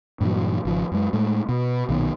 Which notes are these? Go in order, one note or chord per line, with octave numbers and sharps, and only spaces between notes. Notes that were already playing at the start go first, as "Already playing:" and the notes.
G2 A#2 E3 F#3
G#1 C#3 F3
F#2 G#3
A2 G#3 A3
B2
B1 A#2 D#3 B3